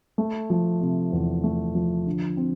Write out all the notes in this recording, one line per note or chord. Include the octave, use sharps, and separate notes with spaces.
A3
F3
C3
E2
A3
F3
D3
C4